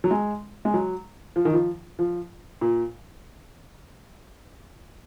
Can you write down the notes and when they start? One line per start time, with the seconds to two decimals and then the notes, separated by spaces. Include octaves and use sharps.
0.04 F#3
0.11 G#3
0.65 G#3
0.74 F#3
1.36 F3
1.45 D#3
1.53 F3
1.99 F3
2.61 A#2